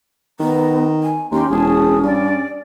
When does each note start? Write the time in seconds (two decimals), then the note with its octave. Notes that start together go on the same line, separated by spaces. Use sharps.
0.40 D#3 B3 A#5
1.03 G#5
1.31 D#2 C#4 G4 A#5 C6
1.50 E1 G#4 A5 D#6
2.03 G2 D5